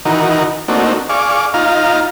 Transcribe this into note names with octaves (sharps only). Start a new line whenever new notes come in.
D#3 E3 D#4 F#4 A#4
A3 A#3 C4 D4 D#4 F#4
G#4 D5 F5 C#6 D6
D#4 F4 F5 A#5